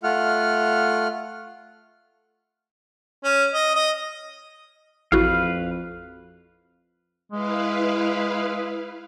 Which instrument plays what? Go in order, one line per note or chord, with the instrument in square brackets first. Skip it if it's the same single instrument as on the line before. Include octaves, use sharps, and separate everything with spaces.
[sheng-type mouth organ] A3 F4 F#5 F6
[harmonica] C#4
D#5
D#5
[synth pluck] A1 E4 F#4 [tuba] F2 [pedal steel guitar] B4 F5
[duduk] G#3 [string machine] E4 B4 F5